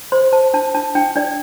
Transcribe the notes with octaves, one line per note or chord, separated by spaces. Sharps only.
C5 C6
C5 A5
D4 A5
D4 A5
D4 G5
D4 D5